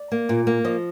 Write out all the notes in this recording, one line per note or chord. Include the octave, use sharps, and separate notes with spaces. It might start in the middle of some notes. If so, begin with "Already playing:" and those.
Already playing: D5
A#3
A#2
A#3
F3 D#5